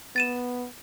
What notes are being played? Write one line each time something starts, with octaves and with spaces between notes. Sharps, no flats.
B3 A6 D#7 E7